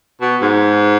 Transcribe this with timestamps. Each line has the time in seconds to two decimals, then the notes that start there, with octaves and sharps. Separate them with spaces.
0.21 B2
0.41 G#2